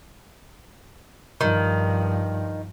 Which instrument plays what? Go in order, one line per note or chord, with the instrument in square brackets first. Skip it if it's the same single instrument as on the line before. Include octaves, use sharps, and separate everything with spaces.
[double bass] G2 F3 [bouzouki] D#3